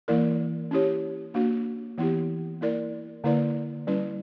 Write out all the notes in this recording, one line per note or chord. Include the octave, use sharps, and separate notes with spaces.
E3 A#3 E4 A#4 D5
C#4 E4 G4 C#5
A#3 D4 F#4
E3 B3 E4 G4
A#3 E4 A#4 D5
D3 A#3 E4 B4 D5
G3 C#4 E4 B4